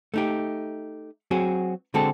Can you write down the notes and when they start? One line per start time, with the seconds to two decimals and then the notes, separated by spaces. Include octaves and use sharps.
0.14 A3 D#4 G4
1.31 F#3 C4 F#4 G#4
1.94 D3 G#3 C4 F#4 A4